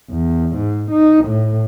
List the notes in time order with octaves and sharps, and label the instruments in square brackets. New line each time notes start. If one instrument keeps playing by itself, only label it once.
[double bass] E2
G#2
D#4
A2